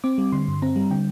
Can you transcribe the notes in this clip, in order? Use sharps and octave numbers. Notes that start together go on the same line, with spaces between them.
C4 D6
G3
D3 C6
G2
C4 A#5
G3
D3 G5